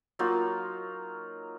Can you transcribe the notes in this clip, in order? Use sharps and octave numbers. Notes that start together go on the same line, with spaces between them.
F#3 A#3 D#4 F4